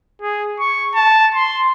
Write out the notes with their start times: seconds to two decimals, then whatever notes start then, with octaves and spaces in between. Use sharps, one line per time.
0.22 G#4
0.60 C#6
0.95 A5
1.35 C6